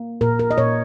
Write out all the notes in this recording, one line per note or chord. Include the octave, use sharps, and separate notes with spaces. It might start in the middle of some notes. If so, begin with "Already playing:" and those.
Already playing: A#3
A#2 A#4
A#4
D#5
A#2 C#5